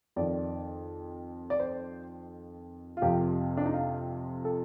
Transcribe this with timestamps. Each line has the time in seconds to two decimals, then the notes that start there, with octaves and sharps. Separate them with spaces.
0.16 F2 D#3 D5
1.50 D5
1.60 C5
2.97 F4
3.02 F2 C3 F3 G4
3.57 D4
3.66 D#4
3.73 F4
4.45 A4